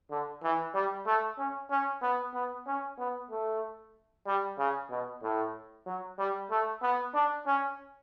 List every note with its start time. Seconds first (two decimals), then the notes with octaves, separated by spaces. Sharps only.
0.11 D3
0.43 E3
0.74 G3
1.06 A3
1.38 C#4
1.70 C#4
2.02 B3
2.34 B3
2.67 C#4
2.99 B3
3.31 A3
4.27 G3
4.59 C#3
4.90 B2
5.22 A2
5.86 F#3
6.19 G3
6.51 A3
6.82 B3
7.14 D4
7.47 C#4